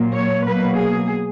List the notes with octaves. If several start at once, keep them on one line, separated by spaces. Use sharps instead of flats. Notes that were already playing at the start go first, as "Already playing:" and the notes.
Already playing: A#2 F#3 A#3
C#5
B2 F#3 A#3 B4
G#4